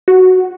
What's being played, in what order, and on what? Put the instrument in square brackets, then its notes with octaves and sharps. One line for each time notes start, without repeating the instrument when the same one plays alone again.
[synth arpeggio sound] F#4